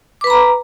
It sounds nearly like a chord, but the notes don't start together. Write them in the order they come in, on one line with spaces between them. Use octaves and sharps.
D6 B4 B5 A#5